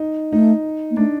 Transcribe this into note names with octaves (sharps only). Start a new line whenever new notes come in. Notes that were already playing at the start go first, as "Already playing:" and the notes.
Already playing: D#4
A3 D#4
A#3
A3 D4